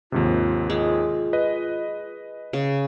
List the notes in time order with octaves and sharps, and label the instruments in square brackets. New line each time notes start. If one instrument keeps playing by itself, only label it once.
[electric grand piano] D#2 G#2 C3 [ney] F4
[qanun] G#3
[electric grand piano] B4 D#5
[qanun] C#3